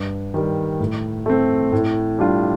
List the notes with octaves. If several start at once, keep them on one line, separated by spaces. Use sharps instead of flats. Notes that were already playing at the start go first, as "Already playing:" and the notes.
Already playing: G2
D#3 G3
A2
A3 C4
A2
G3 D4 F4